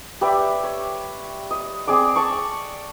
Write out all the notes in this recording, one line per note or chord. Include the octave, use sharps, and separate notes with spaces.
G4 B4 D5 E5
C#5
D#5
C4 G#4 D5 D6
D5 A5 C#6